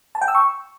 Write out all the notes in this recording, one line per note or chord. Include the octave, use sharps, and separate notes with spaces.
A5
G5
E6
C#6